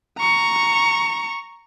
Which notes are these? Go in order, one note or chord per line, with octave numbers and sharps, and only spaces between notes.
A#5 C#6